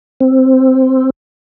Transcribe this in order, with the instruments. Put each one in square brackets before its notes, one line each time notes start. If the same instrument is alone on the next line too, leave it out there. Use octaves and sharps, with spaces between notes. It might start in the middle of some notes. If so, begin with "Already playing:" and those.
[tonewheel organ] C4